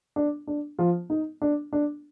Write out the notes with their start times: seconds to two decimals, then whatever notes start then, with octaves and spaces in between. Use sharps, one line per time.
0.16 D4
0.47 D4
0.79 F3 F4
1.10 D#4
1.42 D4
1.73 D4